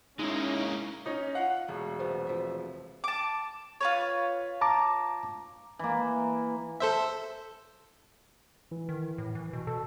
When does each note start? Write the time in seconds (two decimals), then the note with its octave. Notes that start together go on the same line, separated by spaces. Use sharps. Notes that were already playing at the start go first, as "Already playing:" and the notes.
0.19 G#3 A#3 C#4 D#4 E4
1.06 C#4 D#4
1.35 F4 F5 F#5
1.68 E1 A3
1.99 C3 A3 B3
2.27 F3 E5
3.04 A5 D6
3.81 F4 B4 C#5
4.61 A5 A#5 D6
5.79 E3 A#3
6.80 A4 C5 E5
8.72 E3
8.89 D#3
9.18 A2
9.35 E3
9.53 B2
9.67 B2 A4